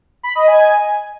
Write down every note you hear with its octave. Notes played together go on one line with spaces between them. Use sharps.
B5
D#5
G#5